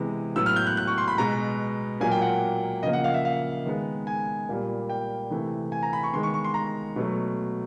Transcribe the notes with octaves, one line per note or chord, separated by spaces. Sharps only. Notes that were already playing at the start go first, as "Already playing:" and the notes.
Already playing: C3 E3 G#3 B3
A2 F#3 B3 E6
F6
G6
F#6
F#6
C#6
C6
B5
B2 G#3 B3 A#5
A#2 F#3 A#3 G#5
G5
F#5
C#3 F3 A#3 D#5
F#5
F5
E5
F5
D#3 G#3 B3
G#5
A#2 G3 A#3
G5
C3 E3 A3
G#5
A#5
B5
C#6
D#3 G#3 B3 C6
C#6
C#6
C6
A#5
B2 F#3 A3